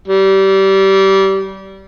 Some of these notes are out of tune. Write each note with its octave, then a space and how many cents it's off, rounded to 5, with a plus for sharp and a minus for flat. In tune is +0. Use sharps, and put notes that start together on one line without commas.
G3 -25